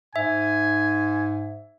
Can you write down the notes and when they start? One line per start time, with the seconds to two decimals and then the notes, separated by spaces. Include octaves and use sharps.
0.16 G#2 E5 G#5